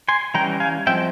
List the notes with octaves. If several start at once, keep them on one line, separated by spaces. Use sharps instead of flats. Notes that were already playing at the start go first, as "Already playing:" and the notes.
G#5 C6
E3 G3 C#4 G5 A#5
F5 G#5
F3 G#3 C4 E5 G5